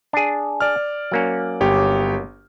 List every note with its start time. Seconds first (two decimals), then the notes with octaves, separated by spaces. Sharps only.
0.13 D4 G#4
0.60 D5 F6
1.12 F#3 A#3 C#4
1.61 G1 G4 C#5